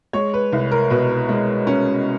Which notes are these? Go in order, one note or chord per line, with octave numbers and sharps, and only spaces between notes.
G#3 C#5
B4
C2
A#4
B2 B4
G#3
C#4